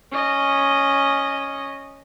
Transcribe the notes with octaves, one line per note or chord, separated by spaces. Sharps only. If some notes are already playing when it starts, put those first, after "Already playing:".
C#4 D#5